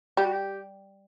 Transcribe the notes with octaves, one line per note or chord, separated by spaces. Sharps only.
G3 G4
F#4
G4